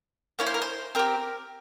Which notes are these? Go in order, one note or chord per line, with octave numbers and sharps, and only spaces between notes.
A#3 C#4 E4 C#5
C5
A#4
C5
C4 G4 A#4